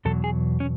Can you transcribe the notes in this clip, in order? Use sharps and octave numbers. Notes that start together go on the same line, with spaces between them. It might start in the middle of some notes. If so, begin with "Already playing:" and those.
E2 B2 F#3 A4
G#4
C#4